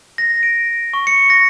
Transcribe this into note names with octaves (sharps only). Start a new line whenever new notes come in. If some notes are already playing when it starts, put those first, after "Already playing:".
A#6
D7
C#6
C#7
A#6